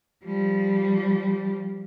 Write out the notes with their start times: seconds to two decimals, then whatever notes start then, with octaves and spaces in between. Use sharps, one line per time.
0.25 F3 G3